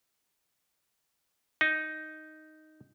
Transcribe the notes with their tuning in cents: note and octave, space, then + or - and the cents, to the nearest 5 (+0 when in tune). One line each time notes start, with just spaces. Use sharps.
D#4 +0